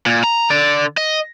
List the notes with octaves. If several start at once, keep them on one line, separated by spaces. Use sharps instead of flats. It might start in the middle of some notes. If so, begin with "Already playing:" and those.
A#2
A#5
D3 D5
D#5